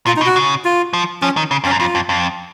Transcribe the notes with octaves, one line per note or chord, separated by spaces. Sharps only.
A#2 F4
D#4
B2
F#4
C#3
F4
F3
F3 C#4
D#3
C#3
F2 C#4
F#2
F2 F4
F2
F2